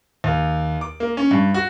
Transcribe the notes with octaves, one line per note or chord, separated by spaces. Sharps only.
D#2
D6
A#3
C#4
G2
F#4